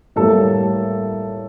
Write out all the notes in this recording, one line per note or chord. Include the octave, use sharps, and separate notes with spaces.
A2 G3 A#3 A4 A5